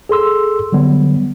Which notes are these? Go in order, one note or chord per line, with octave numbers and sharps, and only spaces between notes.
G#4 A4 C6 E6
D3 F#3 G3 B3